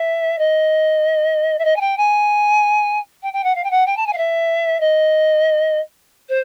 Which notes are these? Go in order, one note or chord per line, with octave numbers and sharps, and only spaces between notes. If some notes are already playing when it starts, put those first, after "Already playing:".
Already playing: E5
D#5
E5
D#5
G#5
G5
G#5
G5
G5
F#5
F5
G5
F#5
G5
A5
G#5
F5
E5
D#5
C5